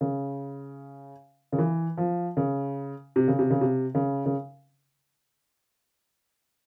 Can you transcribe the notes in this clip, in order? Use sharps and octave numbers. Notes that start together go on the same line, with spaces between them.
C#3
C#3
E3
F3
C#3
C3
C#3
C3
C#3
C3
C#3
C#3